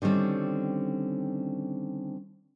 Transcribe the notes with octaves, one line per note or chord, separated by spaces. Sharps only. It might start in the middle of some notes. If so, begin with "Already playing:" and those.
D3 D#3 G3 C4 C#4